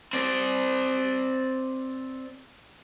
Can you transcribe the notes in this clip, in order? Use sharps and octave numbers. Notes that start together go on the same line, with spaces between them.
C4 D5